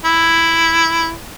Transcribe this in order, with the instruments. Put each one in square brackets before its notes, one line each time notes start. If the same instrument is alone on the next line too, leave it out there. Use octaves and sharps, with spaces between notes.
[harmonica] E4